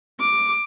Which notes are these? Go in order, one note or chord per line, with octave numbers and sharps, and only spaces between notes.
D6